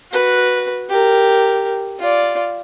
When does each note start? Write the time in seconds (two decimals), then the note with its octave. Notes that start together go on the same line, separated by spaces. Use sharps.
0.12 F#4 B4
0.89 G4 A#4
1.99 F4 D5